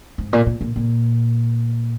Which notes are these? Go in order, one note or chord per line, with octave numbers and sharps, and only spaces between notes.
G#2
A#2
A#2
A#2
A#2